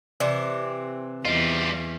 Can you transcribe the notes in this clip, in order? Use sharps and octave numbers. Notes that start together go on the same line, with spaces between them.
C3 E3 C4 D5
E2 G3 F4 D#5